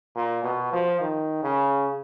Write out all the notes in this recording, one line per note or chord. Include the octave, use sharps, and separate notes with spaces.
A#2
B2
F3
D#3
C#3